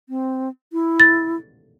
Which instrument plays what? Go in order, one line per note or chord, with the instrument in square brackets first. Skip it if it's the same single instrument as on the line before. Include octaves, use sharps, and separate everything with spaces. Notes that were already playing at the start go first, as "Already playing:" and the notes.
[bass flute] C4
E4
[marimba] A6